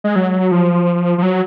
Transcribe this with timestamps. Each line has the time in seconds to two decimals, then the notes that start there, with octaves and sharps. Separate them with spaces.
0.04 G#3
0.16 F#3
0.52 F3
1.18 F3
1.23 F#3